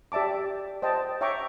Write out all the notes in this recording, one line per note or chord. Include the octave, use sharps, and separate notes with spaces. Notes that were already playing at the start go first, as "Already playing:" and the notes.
G4 D5 E5 A5 D6
C5 D#5 G5 A5
C#5 E5 G5 A#5 C#6 D6